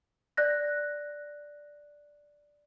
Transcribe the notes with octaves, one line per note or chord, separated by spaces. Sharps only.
D5 F#6 A#6